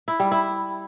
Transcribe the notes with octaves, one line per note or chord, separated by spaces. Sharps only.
E4
G3
E4